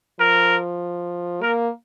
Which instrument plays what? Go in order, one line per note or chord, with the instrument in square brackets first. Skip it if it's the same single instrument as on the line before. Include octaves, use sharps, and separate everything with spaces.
[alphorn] F3 [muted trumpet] A#4
[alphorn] A#3 [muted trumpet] A#4